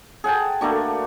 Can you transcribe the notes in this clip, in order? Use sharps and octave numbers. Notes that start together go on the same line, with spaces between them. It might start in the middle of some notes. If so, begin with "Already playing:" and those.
G#4 F#5 G5 A5
A3 A#3 D4 F#4